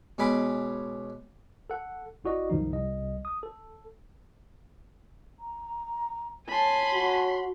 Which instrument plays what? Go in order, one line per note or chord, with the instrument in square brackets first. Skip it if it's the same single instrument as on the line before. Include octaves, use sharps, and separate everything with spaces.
[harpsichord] B2 G#3 C#4 G#5 B5 D6
[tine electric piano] A4 F#5
G#1 E4 F#4 D5 D#5
C2 F#2 D#3 F3 D#4
C2 D#5
D#6
A4
[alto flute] A#5
[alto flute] C#5 [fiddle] G#5 A5 [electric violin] B5 C6
[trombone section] F#4